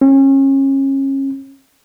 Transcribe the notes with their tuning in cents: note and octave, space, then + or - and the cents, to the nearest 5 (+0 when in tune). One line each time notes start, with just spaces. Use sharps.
C#4 -30